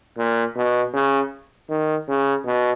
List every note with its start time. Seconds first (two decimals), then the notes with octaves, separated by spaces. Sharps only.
0.18 A#2
0.56 B2
0.93 C#3
1.69 D#3
2.08 C#3
2.45 B2